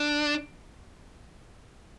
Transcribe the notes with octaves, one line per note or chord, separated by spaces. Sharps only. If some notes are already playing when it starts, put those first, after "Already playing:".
Already playing: D4